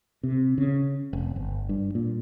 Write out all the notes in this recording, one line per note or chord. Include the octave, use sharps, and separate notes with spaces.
C3
C#3
F1
G1
G2
A#2